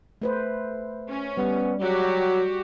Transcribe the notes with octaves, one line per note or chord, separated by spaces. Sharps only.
A3 B4 C5
C#4
G3 B3
F#3 F#4 G4